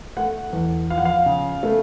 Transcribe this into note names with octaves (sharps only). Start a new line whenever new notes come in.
A3 F#5
E2
F3 F5
F#5
F5
C#3
A3